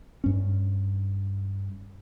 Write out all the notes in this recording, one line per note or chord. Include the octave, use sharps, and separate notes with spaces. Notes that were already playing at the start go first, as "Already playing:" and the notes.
G2 C#4